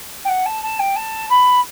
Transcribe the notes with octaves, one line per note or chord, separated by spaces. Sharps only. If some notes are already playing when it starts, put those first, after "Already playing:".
G5
F#5
A5
A5
G5
A5
B5